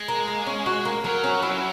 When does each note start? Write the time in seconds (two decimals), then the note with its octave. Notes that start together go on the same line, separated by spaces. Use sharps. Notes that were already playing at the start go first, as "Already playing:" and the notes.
Already playing: G#3
0.08 A#3
0.28 A#3
0.47 C#4
0.66 F#4
0.85 A#3
1.04 F#3 A#4
1.24 C#4
1.42 E4